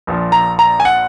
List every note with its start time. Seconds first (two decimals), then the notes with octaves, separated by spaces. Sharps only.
0.07 A#1 A#2 F3
0.32 A#5
0.59 A#5
0.80 G#5
0.85 F#5